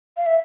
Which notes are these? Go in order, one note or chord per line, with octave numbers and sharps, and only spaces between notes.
F5
E5